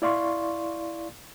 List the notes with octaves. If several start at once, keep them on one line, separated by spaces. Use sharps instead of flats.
E4 D5 F5 C6 C#6